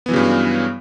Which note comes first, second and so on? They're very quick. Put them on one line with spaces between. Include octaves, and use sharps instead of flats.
B3 E3 F#3 C#3 G2